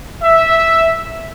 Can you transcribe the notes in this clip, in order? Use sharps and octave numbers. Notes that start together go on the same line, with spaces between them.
E5